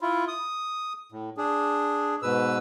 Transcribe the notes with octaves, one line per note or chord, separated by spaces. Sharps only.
E4 F4
D#6
A2
D4 G#4
G#2 B2 B4 E6